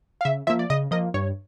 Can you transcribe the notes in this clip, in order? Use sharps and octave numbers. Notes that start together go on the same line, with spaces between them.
F5
C#3 E5
F3 A#3 E5
D5
C#3 D#5
F3 A#3 D#5
G2 C#5